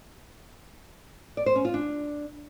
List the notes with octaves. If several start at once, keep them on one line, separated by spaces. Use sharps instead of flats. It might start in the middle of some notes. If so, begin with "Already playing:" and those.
D5
C5
C#4
F4
D4